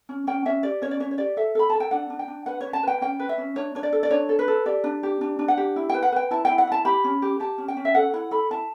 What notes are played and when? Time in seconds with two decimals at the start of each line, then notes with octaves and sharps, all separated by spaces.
0.09 C#4
0.27 C#4 G5
0.45 C#4 E5
0.63 G4 D5
0.82 C#4 C#5
0.91 D5
1.00 C#4 C#5
1.11 C#5
1.18 G4 D5
1.37 A4 E5
1.55 A4 B5
1.70 A4 A5
1.80 G5
1.91 D4 F#5
2.10 D4
2.19 G5
2.28 D4
2.46 B4 F#5
2.61 C#4 C#5
2.73 A5
2.83 B4 G5
3.01 C#4 G5
3.20 B4
3.29 E5
3.38 C#4
3.56 D4 C#5
3.75 D4 C#5
3.83 D5
3.93 A4
4.03 D5
4.10 D4 C#5
4.29 A4
4.39 B4
4.48 A4
4.66 G4 D5
4.84 D4
5.03 G4
5.21 D4
5.39 D4
5.48 F#5
5.57 G4
5.76 E4
5.89 B4 G5
6.03 F#5
6.12 B4 G5
6.31 E4 A5
6.45 E4 G5
6.58 F#5
6.67 E4 A5
6.85 G4 B5
7.04 C#4
7.22 G4
7.40 G4 A5
7.58 C#4
7.68 G5
7.77 C#4
7.85 E5
7.95 A4 F#5
8.13 E4 F#5
8.31 A4 B5
8.50 E4 A5